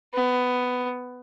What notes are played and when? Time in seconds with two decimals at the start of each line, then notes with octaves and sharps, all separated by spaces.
0.14 B3